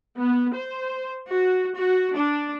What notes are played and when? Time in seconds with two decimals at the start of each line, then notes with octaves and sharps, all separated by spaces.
0.16 B3
0.53 C5
1.29 F#4
1.76 F#4
2.15 D4